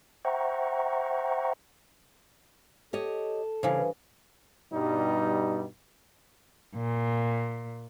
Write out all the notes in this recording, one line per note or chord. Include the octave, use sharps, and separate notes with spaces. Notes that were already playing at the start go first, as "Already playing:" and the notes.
C5 E5 F#5 G5 A#5 C#6
G4 A4 C#5 D#5
G2 C#3 E3 C5 F5 G#5
G2 B2 G3 D#4
A#2